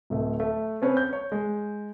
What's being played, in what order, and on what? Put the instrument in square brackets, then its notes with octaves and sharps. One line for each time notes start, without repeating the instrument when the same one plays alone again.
[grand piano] D1 A3
A3
C4 C#4 B4 C#5
G6
C#5
G#3